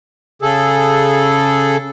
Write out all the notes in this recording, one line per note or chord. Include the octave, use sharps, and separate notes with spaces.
C#3 G#4 A4